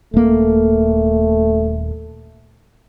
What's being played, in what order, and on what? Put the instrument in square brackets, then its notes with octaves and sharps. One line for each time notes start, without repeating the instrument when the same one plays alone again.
[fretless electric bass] D#1 A#3 [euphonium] A3